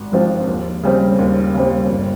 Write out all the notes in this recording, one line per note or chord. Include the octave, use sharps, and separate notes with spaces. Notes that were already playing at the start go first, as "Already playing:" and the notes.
Already playing: G#1
G#2 F3 C4 F4
D#2
C#3 G3 C4
D#2
C#3 G3 C4
G1